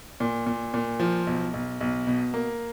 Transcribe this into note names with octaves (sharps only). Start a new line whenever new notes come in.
A#2
A#2
A#2
F3
B1
B1
B1
B2
A#3